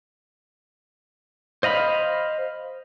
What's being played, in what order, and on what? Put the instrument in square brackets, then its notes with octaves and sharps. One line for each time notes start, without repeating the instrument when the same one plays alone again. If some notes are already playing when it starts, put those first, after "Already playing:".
[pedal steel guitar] C5 D#5 F5 B5